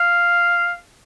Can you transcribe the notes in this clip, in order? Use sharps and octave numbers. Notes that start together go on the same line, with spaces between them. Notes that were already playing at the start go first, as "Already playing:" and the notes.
Already playing: F5